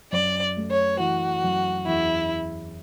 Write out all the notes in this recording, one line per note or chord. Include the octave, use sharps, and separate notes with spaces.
F#2 D5
A3
C#5
E3 F#4
F#2
E2 E4